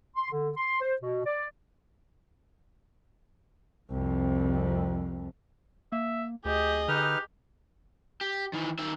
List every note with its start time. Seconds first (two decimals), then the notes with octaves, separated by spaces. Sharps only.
0.16 C6
0.31 D3
0.57 C6
0.81 C5
1.01 B2
1.25 D5
3.91 C2 F2
5.92 A#3 E5
6.45 D2 G4 G#4 D#5
6.88 D3 D#4 G4 B4 F6
8.21 G4
8.53 D#3 E3
8.79 D#3 E5